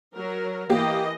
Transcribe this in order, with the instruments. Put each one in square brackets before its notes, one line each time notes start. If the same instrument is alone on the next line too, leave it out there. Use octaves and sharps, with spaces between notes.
[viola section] F#3 A#4
[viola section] E3 D#5 [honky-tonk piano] A#3 G4